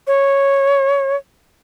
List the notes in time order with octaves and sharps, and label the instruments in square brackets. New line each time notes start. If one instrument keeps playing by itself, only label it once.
[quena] C#5